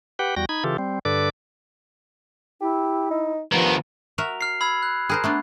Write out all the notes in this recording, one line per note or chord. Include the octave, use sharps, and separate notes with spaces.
G4 B4 F#5 G5
E2 G3 F#4 G5 A#6
D#4 B5 G#6
C#3 E3 F4 G4 A4
G3 C4
G2 D3 A4 B4 D5 D6
E4 G4
D#4
G2 D#3 F3 B3
F#4 A#4 E5 F7
F6 C7
B5 E6 G#6
F#6
G#4 A#4 C5 F#6
A3 B3 D4